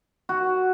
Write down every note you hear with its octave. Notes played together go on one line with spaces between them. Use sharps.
F#4